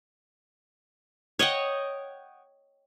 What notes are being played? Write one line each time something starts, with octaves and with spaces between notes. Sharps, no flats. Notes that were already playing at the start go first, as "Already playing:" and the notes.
C#5 D#5 F#5 G5